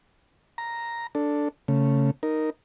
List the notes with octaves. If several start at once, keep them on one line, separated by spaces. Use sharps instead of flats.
A#5
D4 A4
C#3 A3
D#4 A#4